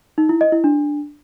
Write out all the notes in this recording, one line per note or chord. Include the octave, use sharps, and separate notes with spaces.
D#4
E4
D#5
E4
D4